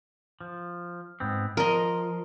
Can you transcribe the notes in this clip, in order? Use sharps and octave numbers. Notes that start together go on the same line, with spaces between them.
F3
G#2 B3 C4
F3 A#4 D#5